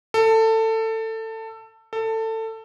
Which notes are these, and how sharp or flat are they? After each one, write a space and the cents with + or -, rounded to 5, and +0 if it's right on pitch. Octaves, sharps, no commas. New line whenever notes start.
A4 +20
A4 +20